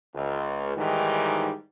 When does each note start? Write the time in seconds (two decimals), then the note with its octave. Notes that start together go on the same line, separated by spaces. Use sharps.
0.15 C#2
0.76 G#2 D#3 E3 G3